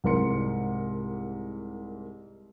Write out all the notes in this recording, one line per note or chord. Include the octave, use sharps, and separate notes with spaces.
C2 G#2 A#4 C6 C#7